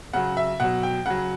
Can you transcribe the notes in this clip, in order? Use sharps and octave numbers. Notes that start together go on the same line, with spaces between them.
C#3 F#3 F#5
E5
B2 F#3 F#5
G5
C#3 F#3 F#5